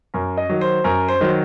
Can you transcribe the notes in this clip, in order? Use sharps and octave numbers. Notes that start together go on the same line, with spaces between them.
F#2 A#4
D#5
D#3 F#3
C5
F#2 A#4
C5
D#3 F#3